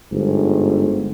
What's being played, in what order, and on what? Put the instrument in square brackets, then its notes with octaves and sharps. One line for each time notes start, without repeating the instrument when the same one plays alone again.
[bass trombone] G1 [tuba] G#2